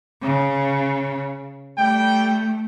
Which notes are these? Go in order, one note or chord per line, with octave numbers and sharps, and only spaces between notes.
C#3
G3 A3 G5